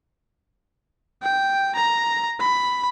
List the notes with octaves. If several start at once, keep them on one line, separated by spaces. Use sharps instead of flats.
G5
A#5
B5